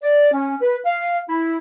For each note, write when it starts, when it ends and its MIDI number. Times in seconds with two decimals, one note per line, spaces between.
0.03 0.31 74
0.33 0.55 61
0.61 0.77 71
0.85 1.17 77
1.29 1.57 64